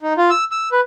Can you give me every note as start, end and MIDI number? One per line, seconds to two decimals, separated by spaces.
0.01 0.13 63
0.17 0.30 65
0.30 0.44 88
0.52 0.69 88
0.72 0.81 71